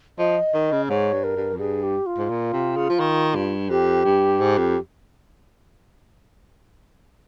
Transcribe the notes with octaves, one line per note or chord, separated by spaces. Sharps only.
F3 D#5
D#3
C#3
G#2 C#5
G2
A#4
G2
F2
G2 G#4
G4
F4
G#2
A#2
C3
C#3
F3
D#3
G2
F2 G4
G2
G#2
F2